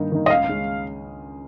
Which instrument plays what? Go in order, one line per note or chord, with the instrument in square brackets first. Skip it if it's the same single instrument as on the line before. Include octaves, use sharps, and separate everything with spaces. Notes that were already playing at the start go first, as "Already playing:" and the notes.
Already playing: [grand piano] G2 D#3 A#3 D#4
D#3 A#3 D#4
[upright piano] D#5
[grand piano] C#2 [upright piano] F5
[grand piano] C#3 G#3 C#4